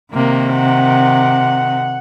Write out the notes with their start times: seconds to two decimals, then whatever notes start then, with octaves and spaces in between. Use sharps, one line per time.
0.13 C3 D#3 A#3
0.54 F#5